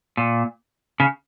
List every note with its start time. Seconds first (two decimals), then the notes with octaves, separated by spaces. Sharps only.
0.17 A#2
1.00 C#3